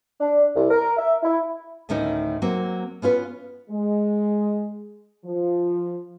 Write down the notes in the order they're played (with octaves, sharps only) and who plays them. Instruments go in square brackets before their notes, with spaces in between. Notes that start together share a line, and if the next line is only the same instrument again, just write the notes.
[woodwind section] D4
C2
A#4
E5
E4
[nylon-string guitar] D2 A2 D#3 A3 C#4 D#4
F#3 A#3 C4
B3 C#4 F4 B4
[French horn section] G#3
F3